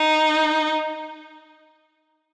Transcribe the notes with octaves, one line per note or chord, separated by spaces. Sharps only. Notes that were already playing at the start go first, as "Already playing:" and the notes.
Already playing: D#4